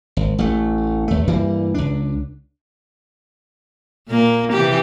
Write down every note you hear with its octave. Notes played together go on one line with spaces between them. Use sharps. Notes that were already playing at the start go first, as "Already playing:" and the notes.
G#1
A1 A3
D#2 A3
G2 E3 G3 A#3
C#2 D4
A#2 A#3
C3 E3 G4